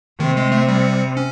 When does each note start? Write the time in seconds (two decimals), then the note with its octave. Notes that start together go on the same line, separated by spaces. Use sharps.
0.20 C3 D#3
0.37 G#3
0.52 A3
0.69 G3
1.17 C#4